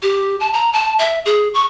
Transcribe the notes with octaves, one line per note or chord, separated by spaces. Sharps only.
G4
A5
A#5
A5
E5
G#4
C#6